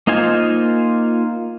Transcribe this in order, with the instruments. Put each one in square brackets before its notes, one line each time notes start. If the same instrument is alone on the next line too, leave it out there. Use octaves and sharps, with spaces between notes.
[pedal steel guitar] A#3 D#4 F4 C5 G#5